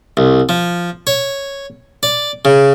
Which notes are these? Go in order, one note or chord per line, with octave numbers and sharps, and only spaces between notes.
C2
F3
C#5
D5
C#3